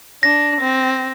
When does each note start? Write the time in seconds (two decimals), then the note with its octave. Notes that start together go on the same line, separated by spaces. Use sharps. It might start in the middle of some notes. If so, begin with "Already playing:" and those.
0.23 D4 A#6
0.60 C4